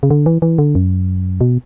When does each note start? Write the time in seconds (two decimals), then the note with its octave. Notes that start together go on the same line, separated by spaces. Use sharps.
0.03 C#3
0.10 D3
0.26 E3
0.42 E3
0.58 D3
0.75 F#2
1.41 B2